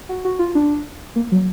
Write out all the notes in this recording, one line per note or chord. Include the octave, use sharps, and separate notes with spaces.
F#4
F#4
F4
D4
A#3
F#3